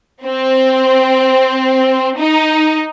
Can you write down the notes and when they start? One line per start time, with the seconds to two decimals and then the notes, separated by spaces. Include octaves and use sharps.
0.24 C4
2.18 D#4